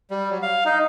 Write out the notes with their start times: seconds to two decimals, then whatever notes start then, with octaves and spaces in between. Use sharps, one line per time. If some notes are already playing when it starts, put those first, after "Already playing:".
0.11 G3
0.30 F#3
0.42 F5
0.65 D#4